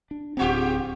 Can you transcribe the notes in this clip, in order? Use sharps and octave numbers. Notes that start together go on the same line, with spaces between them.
D4
D1 G#2 C4 F4 G4